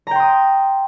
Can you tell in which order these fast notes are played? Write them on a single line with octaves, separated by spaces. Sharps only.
A#5 G5 C6 D#6